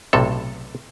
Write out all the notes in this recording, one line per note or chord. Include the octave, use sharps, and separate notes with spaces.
B1 A2 C3 A4